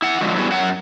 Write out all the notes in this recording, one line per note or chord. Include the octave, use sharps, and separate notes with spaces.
E4 F#5
D3 F3 F#3 G#3
F#3 G3 B3 E4 F#4 G#4
F#2 F#3 F#5